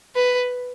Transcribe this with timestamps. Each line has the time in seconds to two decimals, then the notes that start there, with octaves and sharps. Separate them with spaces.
0.15 B4